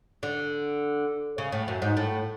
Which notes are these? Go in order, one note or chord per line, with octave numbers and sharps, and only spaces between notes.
D3
C#3
A2
F#2
G#2
A2